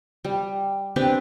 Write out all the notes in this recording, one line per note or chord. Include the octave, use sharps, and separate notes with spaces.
G3
C4 D4 G4 B4